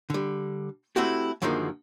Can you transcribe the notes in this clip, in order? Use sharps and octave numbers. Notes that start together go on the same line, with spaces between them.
D3 G3
A3 C4 E4 F#4 G4
F#2 D3 D#3 F3 G#3 A#3